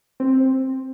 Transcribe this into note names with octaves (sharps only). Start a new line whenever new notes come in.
C4